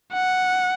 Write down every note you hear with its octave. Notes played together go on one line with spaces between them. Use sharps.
F#5